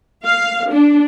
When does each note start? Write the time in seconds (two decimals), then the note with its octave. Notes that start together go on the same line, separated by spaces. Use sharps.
0.25 F5
0.71 D4